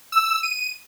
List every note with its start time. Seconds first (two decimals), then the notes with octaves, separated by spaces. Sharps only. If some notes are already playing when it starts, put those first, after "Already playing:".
0.12 E6
0.43 D#7